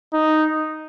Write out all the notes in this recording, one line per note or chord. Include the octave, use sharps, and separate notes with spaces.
D#4